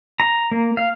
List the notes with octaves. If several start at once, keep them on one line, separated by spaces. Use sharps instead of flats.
A#5
A#3
F5